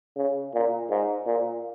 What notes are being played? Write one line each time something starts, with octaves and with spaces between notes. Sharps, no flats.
C#3
A#2
G#2
A#2